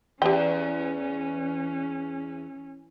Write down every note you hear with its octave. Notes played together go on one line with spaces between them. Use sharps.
E2 C#4 G4 G5